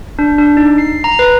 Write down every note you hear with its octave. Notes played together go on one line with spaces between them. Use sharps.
D4
D4
D#4
C7
A#5
B4